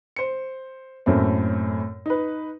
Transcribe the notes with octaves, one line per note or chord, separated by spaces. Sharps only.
C5 C#7
F#2 A2 A3 A#3 C4
D#4 B4